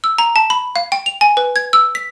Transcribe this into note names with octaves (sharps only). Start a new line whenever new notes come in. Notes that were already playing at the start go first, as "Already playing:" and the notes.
E6
A#5
A5
B5
F5
G5
F7
G#5
B4
G#6
E6
B6